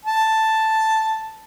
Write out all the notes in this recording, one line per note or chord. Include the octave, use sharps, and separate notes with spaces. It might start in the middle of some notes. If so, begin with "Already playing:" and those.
A5